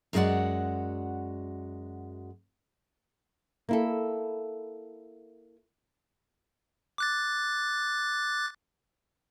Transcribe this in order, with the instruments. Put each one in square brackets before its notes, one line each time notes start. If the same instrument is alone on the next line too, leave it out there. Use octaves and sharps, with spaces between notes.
[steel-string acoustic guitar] F#2 G#3 D#4 F#4 D5 F#5
[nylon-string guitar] A#3 E4 A4
[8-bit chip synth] D6 F#6 A6